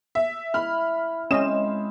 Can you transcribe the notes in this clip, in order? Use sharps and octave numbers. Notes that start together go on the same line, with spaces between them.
E5
E4 B5 F6
G#3 C4 C#4 D#5 E7